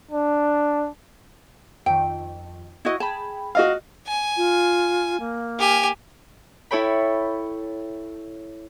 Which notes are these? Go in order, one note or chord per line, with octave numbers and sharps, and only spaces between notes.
D4
F2 D#3 G5
E4 F#4 D#5
G#4 G5 A5 B5
F#4 D#5 F5
G#5
F4
A#3
G4 G#5
E4 A4 C#5 G5 B5